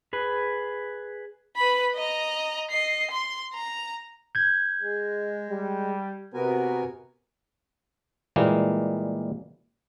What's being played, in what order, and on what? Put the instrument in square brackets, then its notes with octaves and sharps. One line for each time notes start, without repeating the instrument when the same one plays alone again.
[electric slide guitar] G#4 B4
[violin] B4 B5
D#5 A#5
D#5 C7
C6
A#5
[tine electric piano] G6 G#6
[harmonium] G#3
[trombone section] G3
[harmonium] C3 A#4 G#5 [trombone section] B3 F#4
[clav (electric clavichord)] A#2 E3 G3 G#3 A#3